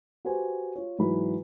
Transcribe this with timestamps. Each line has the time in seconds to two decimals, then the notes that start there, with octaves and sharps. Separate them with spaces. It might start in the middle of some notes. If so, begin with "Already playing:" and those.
0.25 F#4 G4 B4 C5 G#5
0.76 F4 C#5
0.98 G#2 E3 F#3 B4 B5